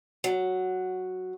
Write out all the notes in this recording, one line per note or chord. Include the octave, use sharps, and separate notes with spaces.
F#3